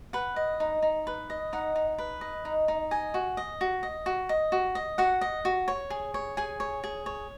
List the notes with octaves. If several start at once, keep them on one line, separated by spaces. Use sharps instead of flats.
B4 F#5
D#5
D#4
D#4
B4
D#5
D#4 F#5
D#4
B4
D#5
D#4
D#4
D#5 G#5
F#4
D#5
F#4
D#5
F#4
D#5
F#4
D#5
F#4 F#5
D#5
F#4
C#5
G#4
C#5
G#4 G#5
C#5
G#4
C#5